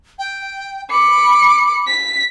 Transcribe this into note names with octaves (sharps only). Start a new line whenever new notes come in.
G5
B5 D6 C#7
B6